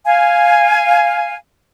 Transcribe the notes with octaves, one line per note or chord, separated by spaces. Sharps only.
F5 G#5